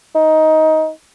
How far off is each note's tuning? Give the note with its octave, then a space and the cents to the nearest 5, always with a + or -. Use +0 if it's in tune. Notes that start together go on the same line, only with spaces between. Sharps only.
D#4 +15